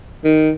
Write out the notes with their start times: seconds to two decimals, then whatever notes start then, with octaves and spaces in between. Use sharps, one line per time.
0.24 D#3